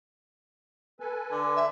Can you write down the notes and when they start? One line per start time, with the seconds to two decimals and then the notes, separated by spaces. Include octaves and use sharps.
1.00 A4 B4 G#5
1.31 D3
1.56 E5